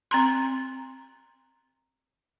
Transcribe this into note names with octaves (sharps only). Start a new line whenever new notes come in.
C4 A#5 C6